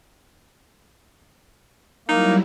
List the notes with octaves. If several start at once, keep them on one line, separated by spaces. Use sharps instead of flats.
F#3 G3 A#3 D#4 E4